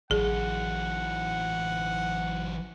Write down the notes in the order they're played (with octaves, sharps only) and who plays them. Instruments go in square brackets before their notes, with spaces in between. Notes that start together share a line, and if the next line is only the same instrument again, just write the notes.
[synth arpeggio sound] A1 [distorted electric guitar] E3 F#3 [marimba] G#4 [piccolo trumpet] F#5